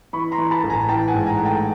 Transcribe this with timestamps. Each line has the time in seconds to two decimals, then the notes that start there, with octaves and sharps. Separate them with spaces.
0.13 E3 B5 C#6
0.32 A#5 C6
0.38 E3
0.51 A5 B5
0.64 A1
0.70 G#5 A#5
0.88 E3 G5 A5
1.08 F#5 G#5
1.13 G#2
1.27 G#5 A#5
1.39 A3
1.45 G5 A5